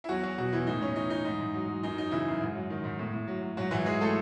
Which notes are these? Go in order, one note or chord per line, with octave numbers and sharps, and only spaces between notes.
E4
E2 F#3 F#4
F#3 F#4
B2 F#3 F#4
E2 E3 E4
A2 D#4
A2 C#4
E3 D#4
E3 D#4
G#2 D#4
G#2
F#3
F#3
F#2 D#4
F#3 D#4
C#3 E3 E4
F#2
G#2
F#3
D#3
G#2
A2
A2
F#3
F#3
G#2 F#3 F#4
G#2 E3 E4
E3 G#3 G#4
E3 A3 A4